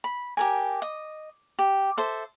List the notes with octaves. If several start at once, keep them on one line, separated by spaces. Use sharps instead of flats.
B5
G4 A#4 G#5
D#5
G4
A4 C5 E5